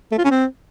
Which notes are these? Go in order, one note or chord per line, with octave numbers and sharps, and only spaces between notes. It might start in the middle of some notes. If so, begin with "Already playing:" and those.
A3
F4
C#4
C4